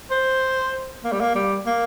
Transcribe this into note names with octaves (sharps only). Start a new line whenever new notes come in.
C5
A#3
G3
A#3
G3
A#3